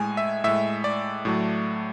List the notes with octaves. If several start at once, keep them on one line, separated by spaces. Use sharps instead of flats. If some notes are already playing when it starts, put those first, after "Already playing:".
Already playing: A2 G#3 G#5
E5
A2 G#3 E5
D5
A2 F#3 A3